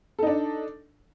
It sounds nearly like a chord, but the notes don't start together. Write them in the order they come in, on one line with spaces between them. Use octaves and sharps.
A4 D#4 D4